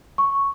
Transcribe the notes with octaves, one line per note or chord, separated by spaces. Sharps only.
C#6